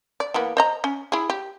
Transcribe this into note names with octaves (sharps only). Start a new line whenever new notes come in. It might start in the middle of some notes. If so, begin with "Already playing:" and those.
D5
E3 A#3 B3
C5 D#5 A#5
C#4
E4 G#4
G4